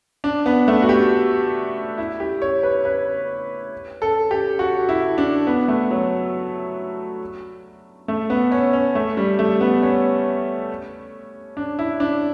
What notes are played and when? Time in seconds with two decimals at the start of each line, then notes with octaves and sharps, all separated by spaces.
0.24 D4
0.46 B3
0.68 A3
0.82 F#4
0.89 G4
1.98 E4
2.20 G4
2.42 C#5
2.63 B4
2.85 B4
4.02 A4
4.31 G4
4.59 F#4
4.89 E4
5.18 D4
5.47 B3
5.68 A3
5.91 F#3
8.08 A3
8.30 B3
8.52 C#4
8.73 C#4
8.95 A3
9.17 G3
9.39 A3
9.61 B3
9.83 C#4
11.57 D4
11.79 E4
12.00 D4